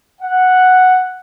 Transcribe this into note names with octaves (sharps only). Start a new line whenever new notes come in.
F#5